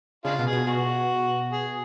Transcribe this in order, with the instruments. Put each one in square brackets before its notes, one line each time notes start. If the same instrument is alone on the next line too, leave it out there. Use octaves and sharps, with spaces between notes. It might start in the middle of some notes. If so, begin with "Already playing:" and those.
[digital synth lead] C#3 [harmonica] G#3 D4 F4
[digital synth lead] B2
[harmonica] G#4
[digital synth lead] B2
[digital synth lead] B2 [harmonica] F#4
[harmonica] G#4